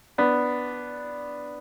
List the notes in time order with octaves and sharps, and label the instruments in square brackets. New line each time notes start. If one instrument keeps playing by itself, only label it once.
[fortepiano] B3 D4